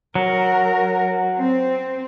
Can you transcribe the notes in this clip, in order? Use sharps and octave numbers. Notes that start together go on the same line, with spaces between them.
F#3 A#4
C4